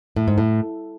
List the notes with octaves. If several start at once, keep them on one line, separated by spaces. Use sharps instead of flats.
A2
G#2
A2